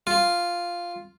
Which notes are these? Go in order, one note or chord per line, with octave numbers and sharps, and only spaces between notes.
F4